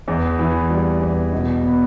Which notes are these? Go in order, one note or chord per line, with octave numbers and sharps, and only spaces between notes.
E2
E3
G3
E2
B2
B3